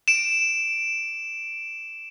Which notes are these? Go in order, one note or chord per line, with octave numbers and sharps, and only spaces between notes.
D7 E7